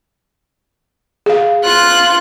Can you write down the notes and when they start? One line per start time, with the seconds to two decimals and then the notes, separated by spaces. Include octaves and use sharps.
1.26 G#4 F5
1.64 F4 F#6